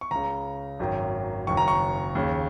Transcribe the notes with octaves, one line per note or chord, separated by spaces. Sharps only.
C#6
C#2 C#3 A#5
G#1 F#2 D#3
F#1 F#2 D#3 C#6
A#5
C#6
D#2 C#3